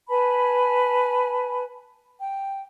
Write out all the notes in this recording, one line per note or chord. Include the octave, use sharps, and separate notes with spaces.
B4 G#5 A5 B5
G5